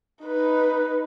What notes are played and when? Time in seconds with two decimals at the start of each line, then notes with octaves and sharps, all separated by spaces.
0.24 D#4 B4